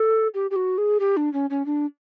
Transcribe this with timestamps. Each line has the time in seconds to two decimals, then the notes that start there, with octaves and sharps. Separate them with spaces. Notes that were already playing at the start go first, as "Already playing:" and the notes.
Already playing: A4
0.34 G4
0.51 G4
0.56 F#4
0.78 G#4
1.00 G4
1.17 D4
1.33 C#4
1.50 C#4
1.66 D4